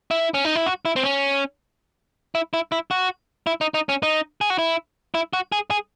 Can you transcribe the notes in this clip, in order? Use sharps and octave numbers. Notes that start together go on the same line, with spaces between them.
E4
C#4
D#4
E4
F#4
E4
C4
C#4
E4
E4
E4
F#4
E4
D#4
D#4
C#4
D#4
G#4
F#4
E4
E4
F#4
G#4
G#4